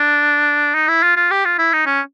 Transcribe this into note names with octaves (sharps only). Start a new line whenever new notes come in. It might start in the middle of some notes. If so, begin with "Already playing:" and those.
Already playing: D4
D#4
E4
F4
F4
G4
F4
E4
D#4
C#4